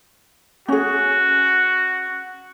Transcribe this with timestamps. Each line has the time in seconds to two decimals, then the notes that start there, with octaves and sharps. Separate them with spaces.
0.68 C#4 F#4 G#4